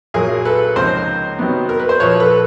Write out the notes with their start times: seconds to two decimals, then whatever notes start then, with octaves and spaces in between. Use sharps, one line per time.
0.14 B1 A#2 F#3 G#4 A#4
0.45 A4 B4
0.76 C#2 C3 F3 A#3 D#4 A#4 C5
1.38 C3 D#3 F#3 B3 D#4
1.69 A#4
1.80 B4
1.89 C5
2.00 A#1 A#2 F3 B4 C#5
2.20 A4 B4